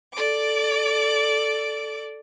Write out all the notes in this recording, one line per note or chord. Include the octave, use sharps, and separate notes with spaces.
A4 D5 D6